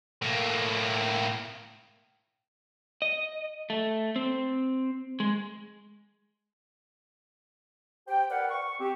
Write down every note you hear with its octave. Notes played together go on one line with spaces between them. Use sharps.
A2 A#3
D#5
A3
C4
G#3
G4 C5 G5
A#4 B4 D5 F5 F#5
C#6
C4 G4